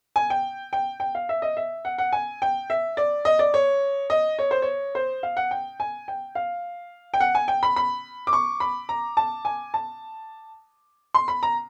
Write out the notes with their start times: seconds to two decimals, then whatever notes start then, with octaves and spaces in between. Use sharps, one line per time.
0.16 G#5
0.30 G5
0.73 G5
1.00 G5
1.15 F5
1.29 E5
1.42 D#5
1.57 E5
1.85 F#5
1.98 F#5
2.13 G#5
2.42 G5
2.70 E5
2.97 D5
3.25 D#5
3.39 D5
3.54 C#5
4.10 D#5
4.39 C#5
4.51 C5
4.62 C#5
4.95 C5
5.23 F5
5.37 F#5
5.51 G5
5.80 G#5
6.08 G5
6.35 F5
7.14 G5
7.20 F#5
7.35 G#5
7.48 G5
7.63 B5
7.76 B5
8.27 D6
8.33 C#6
8.60 B5
8.89 A#5
9.17 A5
9.45 G#5
9.74 A5
11.14 C6
11.28 B5
11.43 A#5